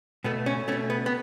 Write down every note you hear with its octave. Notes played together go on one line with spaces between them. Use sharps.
B2 A3 B3
C#4
B2 A3 C#4
B3
B3